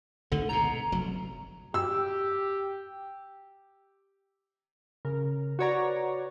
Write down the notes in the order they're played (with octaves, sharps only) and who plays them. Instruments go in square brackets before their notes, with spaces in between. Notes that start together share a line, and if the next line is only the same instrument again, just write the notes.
[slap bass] G#1 D2 D#3 [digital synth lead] D3
[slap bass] G#2 B2 [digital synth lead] A#5
[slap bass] F1 F#3
[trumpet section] G4 [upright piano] E6
[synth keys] C#3 A#4
F#4 B4 C#5 D5 A#5